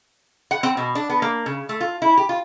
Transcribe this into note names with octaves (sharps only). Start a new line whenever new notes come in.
F#5
C4
B2
D4
B3
A#3
C#3
A3
F4
E4
G4
F4